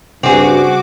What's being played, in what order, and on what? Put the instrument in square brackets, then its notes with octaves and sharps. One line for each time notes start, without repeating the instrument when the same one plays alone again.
[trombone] G2 [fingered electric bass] C#3 G3 [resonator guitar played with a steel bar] C4 G#4 [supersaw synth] F#4 D6